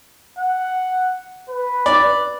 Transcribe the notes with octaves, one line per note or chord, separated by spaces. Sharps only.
F#5
B4
D5